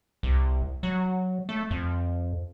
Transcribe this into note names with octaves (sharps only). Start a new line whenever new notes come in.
C2
F#3
A3
F2